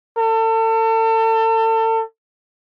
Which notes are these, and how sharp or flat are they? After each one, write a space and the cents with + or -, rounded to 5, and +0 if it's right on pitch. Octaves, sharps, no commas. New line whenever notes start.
A4 +35